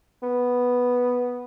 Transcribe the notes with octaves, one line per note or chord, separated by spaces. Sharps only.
B3